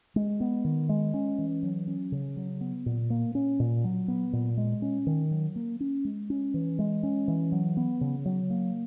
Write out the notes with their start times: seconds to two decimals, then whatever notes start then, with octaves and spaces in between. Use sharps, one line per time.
0.16 G#3
0.40 B3
0.64 D#3
0.89 G#3
1.14 C#4
1.38 E3
1.63 F#3
1.87 C#4
2.12 C#3
2.36 F#3
2.61 B3
2.86 A#2
3.10 A#3
3.35 C#4
3.60 A#2
3.84 F#3
4.08 B3
4.33 A#2
4.57 G#3
4.82 C#4
5.07 D#3
5.31 F#3
5.56 A#3
5.80 C#4
6.05 G#3
6.30 C#4
6.54 E3
6.79 G#3
7.03 C#4
7.28 E3
7.52 F#3
7.77 B3
8.01 C#3
8.25 F#3
8.50 A#3